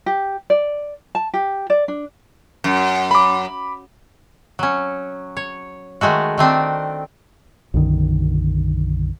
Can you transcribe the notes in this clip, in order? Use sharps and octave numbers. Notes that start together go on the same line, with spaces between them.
G4
D5
A5
G4
D5
D4
F#2
B5 D6
F#3 C#4
C#5
D#3 G#3 A3 F#4
D#3 A3 C4 D4
B1 F#2 D3 D#3